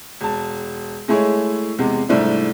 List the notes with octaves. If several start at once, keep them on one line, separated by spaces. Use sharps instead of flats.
E1 A5
G#3 A3 E4 G#4 C#5
E2 C3 G#3
C2 G#2 A3 D4 E4 C5